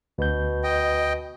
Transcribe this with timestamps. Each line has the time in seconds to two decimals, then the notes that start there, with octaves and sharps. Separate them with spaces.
0.18 D2 B2 G6
0.64 D#5 G5